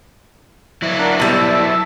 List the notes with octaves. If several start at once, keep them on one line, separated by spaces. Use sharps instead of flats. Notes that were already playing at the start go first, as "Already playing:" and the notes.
F#3 E4
D4 A#4 F#5
B2 G3 E5 A5